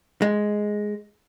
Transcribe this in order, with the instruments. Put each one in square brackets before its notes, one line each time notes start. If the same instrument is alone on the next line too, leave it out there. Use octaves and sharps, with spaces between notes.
[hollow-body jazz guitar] G#3